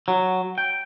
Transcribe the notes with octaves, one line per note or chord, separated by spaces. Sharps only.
F#3
G5